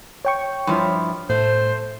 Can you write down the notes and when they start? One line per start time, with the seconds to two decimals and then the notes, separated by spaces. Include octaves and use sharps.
0.25 C#5 G5 C#6
0.67 G2 F3 E4
1.30 A2 A3 C5